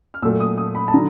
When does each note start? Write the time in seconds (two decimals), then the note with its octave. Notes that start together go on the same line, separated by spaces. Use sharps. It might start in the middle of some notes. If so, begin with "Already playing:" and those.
0.14 F6
0.22 A#2 F#3 A3 E6
0.40 D#6
0.57 D#6
0.75 B5
0.88 A5
0.93 D3 F#3 A#5